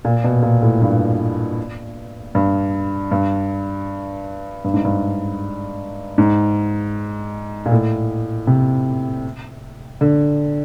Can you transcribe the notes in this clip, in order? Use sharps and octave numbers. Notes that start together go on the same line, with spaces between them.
A#2
B2
A#2
A2
G2
G2
G2
G2
G#2
G2
G#2
A#2
A2
C3
D3